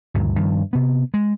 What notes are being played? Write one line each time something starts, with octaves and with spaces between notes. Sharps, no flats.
D2 G2 A#2 D#3
G2 D#3 F3
C3 B3
G#3